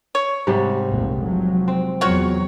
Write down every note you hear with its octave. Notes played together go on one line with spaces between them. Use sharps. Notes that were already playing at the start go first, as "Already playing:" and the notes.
C#5
G#2 C3 G3
F1 C2 A#2
F3 F#3
C4
E2 F#3 F4 F#4 C#5